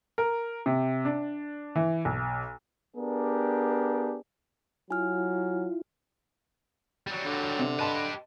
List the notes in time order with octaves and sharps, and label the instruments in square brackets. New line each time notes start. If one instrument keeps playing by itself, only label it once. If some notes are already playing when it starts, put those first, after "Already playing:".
[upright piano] A#4
C3
D4
E3
B1
[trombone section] B3 D4 G4 G#4 A#4
[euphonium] F#3 [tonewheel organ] E4 F4 [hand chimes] G#5 F6
[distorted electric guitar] F#3 G3
[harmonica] D3
[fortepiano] C3
[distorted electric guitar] G4 B4 [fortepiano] D#5 A5 C6